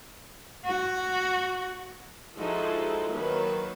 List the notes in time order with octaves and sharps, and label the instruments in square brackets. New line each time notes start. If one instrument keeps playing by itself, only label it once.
[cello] F#4
[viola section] F3 G#3 D#4 E4 F#4 A4
D#3 F#3 A#3 B4